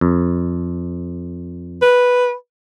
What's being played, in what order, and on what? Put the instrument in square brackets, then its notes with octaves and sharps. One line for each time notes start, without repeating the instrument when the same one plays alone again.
[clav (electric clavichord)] F2
[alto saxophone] B4